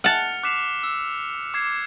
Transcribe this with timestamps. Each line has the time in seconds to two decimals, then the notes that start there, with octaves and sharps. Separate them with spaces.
0.04 F#5 A5 F6 C#7 F7
0.43 D6 F#6 B6 C7 E7 F7
0.83 E6
1.54 D6 G#6 C7